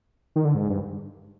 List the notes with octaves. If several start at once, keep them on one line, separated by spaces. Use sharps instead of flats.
D#3
D3
G#2
G2